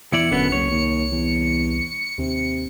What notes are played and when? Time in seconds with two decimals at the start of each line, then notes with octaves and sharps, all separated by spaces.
0.13 E2 E4 D5 C#7
0.31 E1 F#2 D3 B3
0.52 F#1 C2 C#5
0.71 D#2
1.12 E2
2.18 D#2 C3